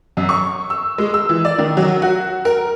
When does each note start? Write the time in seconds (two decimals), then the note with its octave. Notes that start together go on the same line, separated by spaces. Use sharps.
0.17 F#2
0.29 C#6
0.70 E6
0.98 G#3
1.14 E6
1.29 E3
1.45 D5
1.58 D#3
1.77 F#3
2.02 F#4
2.45 A#4